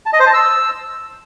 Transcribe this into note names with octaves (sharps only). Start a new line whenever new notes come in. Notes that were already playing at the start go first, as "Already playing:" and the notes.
A5
D#5
C5
A5
E6